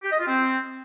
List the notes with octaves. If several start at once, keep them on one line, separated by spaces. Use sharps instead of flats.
G4
D#5
F4
C4